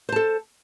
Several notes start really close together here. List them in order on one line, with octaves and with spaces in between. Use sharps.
C5 A5 A4